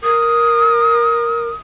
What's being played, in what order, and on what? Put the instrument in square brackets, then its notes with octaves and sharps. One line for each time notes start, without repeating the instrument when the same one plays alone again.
[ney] A#4 [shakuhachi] D#6